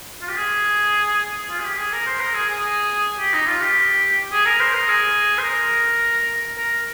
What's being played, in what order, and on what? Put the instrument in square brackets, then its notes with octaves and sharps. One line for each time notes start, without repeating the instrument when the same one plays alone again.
[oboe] F4
G4
G#4
F4
G#4
G4
G#4
A#4
C5
A#4
G#4
G#4
G4
D#4
F4
G4
G#4
A#4
C5
A#4
G#4
C5
A#4
A#4